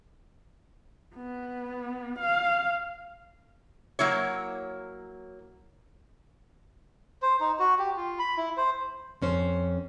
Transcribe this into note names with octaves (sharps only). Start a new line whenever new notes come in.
B3
F5
F#3 A#3 E4 C#5
C5
D#4
F#4
G4
F4
B5
E4
C5
F2 C#4 C5